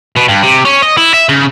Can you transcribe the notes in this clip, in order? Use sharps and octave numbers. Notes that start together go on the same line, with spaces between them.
B2
G2
C3
C#4
D#5
E4
E5
C#3